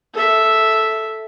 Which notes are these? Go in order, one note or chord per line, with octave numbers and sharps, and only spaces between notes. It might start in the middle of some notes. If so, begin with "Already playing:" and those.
A4 E5